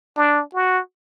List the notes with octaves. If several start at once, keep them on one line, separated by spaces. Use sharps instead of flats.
D4
F#4